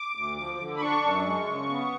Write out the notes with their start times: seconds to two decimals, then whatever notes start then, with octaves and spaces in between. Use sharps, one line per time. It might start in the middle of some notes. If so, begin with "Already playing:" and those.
Already playing: D6
0.15 D2
0.37 F3
0.60 D3
0.77 B5
0.81 D4 C#6
1.03 F#2
1.26 G#3
1.47 C#3
1.69 B3